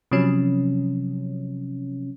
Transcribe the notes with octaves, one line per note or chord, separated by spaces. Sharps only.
C3 F3 F#3 C#4